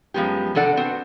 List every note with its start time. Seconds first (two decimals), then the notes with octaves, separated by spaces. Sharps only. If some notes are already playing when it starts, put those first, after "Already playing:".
0.14 F#2 F3 G#3 B3 G4
0.55 C3 D4 A4 D5 F#5
0.77 B3 C4 F#4